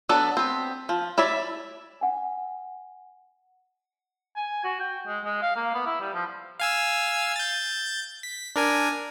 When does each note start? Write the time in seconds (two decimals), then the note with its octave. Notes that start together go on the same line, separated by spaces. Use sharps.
0.09 F#3 B3 D4 A4 F#5
0.37 B3 C4
0.89 F3
1.18 E4 C#5 D5 E5
2.01 F#5 G#5
4.36 G#5
4.64 F#4
4.80 G5
5.07 G#3
5.25 G#3
5.42 F5
5.56 A#3
5.74 B3
5.86 E4
6.00 G3
6.13 F3
6.60 F5 G#5 E6
7.36 G6 A6
8.23 B6
8.56 D4 A#4 G#5